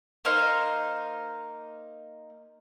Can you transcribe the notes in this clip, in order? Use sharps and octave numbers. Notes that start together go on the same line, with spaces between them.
A#3 D#4 C5 F5